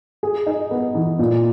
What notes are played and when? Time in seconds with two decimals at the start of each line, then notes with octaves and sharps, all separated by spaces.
0.23 G#4
0.46 D#4
0.71 B3
0.95 E3
1.19 A#2